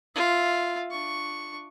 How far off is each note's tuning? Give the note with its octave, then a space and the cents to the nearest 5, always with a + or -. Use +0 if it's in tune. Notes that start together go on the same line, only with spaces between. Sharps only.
F4 +0 E5 +0
D4 +15 C#6 +0